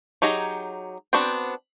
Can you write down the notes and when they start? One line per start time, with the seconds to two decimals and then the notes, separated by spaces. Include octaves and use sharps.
0.22 F#3 D#4 G4 G#4 A#5
1.13 B3 C4 D4 F#4 G5